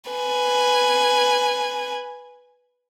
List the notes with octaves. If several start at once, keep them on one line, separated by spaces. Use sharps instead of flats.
B4 G#5